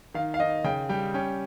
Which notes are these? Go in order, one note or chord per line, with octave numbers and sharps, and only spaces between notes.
D#3 F5
F5
D#3 D#5
C#3 G5
G3 G5
C#4 G5